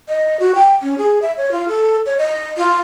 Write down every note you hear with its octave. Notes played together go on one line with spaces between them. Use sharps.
D#5
F#4
G5
C#4
G#4
E5
C#5
F4
A4
C#5
D#5
F4